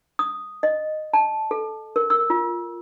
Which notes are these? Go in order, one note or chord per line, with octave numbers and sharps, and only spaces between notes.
D#6
D#5
A5
A4
A#4
E6
F4